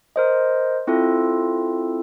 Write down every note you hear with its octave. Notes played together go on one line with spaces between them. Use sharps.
A#4 C5 D#5
C4 E4 F4 A4